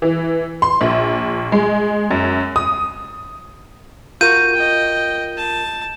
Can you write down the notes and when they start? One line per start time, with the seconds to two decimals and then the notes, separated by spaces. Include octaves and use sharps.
0.02 E3
0.62 C6
0.81 A#1
1.52 G#3
2.11 F#2
2.56 D#6
4.21 F4 F#4 A#4 G6 D#7
4.54 D#5 G5
5.37 A5